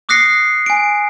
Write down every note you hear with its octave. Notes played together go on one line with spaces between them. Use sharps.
D6 D#6 F#6 A#6 C7 C#7
G#5 D7